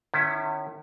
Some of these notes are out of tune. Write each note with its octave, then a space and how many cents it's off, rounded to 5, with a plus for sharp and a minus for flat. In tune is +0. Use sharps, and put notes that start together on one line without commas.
D#3 -40 C#4 +0 E4 +0